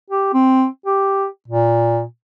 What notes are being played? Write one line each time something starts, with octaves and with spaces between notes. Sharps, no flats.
G4
C4
G4
A#2